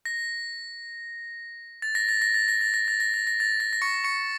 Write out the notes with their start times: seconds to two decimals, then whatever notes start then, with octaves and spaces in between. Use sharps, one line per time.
0.05 A#6
1.82 A6
1.95 A#6
2.09 A6
2.22 A#6
2.34 A6
2.48 A#6
2.61 A6
2.74 A#6
2.88 A6
3.00 A#6
3.14 A6
3.27 A#6
3.40 A6
3.60 A#6
3.73 A#6
3.82 C#6 C#7
4.04 C#6 C#7